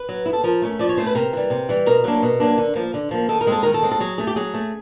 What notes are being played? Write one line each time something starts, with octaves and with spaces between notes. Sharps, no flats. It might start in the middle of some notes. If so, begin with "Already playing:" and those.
Already playing: B4
F#3
E4
B3 A4
F3 A#4
A3 C#4
F3 D5
C#5
A3 C#4 C5
B4
C3 A#4
E3 G3
C3
E3 G3
B2 A#4
F#3 A#3 D4
B2
F#3 A#3 D4
D3
F3 A#3
D3
F3 A#3
D#3 A4
A#4
G#3 C4 A4
D#3 A#4
A4
G#3 C4
A4
F#3 G#4
A3 C#4 G#4
G4
F#3 G#4
A3 C#4